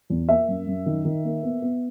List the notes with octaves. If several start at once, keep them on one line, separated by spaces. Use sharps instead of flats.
E2
A#3 E5
F#2
F#2
D#3
D#3
A#3
B3
B3